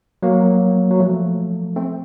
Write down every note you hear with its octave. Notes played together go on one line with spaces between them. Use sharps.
F#3 A#3
F#3
F3 A3
A3 C4